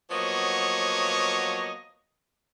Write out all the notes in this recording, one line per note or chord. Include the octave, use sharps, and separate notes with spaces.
F3 F#3 A#3 B3 C#5 D#5